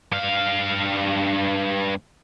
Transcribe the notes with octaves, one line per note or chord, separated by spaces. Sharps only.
G2 F5